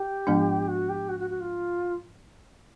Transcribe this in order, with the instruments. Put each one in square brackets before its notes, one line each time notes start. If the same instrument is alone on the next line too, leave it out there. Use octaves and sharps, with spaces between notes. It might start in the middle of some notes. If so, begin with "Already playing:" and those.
Already playing: [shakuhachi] G4
[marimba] G#2 F3 G#3 B3 D4
[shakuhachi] F#4
G4
F#4
F#4
F#4
F4